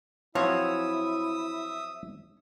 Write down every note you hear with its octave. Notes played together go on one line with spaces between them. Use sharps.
F3 F#3 C4 E4 C#5 E5 D#6